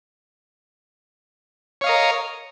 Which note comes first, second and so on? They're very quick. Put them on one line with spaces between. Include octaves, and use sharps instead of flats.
C#5 F5 D#5 A#4